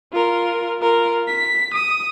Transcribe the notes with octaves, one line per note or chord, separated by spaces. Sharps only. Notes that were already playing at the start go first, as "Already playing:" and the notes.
F4 A#4
F4 A#4
B6
D#6